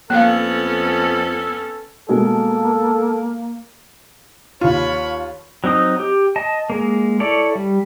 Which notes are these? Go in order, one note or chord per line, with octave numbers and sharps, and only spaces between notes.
F2 A#3 B3 C#4 A4 F5
B2 G#3 A#3 A4 A#4
D#2 F4 C#5 B5
F#3 C4 D#4 D#6
G4
D#5 A5
G#3 A#3
E4 A4 C#5 D5
G3